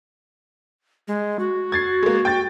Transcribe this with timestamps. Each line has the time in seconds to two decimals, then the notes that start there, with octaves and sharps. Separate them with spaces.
1.08 G#3
1.39 F#4
1.72 G#6 A6 C7
2.03 G#3 A#3
2.25 G5 G6 A6